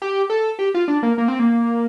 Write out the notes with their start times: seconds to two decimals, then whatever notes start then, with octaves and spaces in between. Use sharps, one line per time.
0.02 G4
0.30 A4
0.59 G4
0.74 F4
0.88 D4
1.03 A#3
1.18 A#3
1.28 C4
1.39 A#3